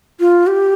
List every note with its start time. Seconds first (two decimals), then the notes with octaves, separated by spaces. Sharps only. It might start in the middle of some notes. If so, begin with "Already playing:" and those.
0.20 F4
0.47 G4